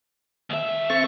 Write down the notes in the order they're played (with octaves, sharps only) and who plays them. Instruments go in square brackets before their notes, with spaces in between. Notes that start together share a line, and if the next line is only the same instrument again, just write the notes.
[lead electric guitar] D#2 E5
[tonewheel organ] C4 A4 C#6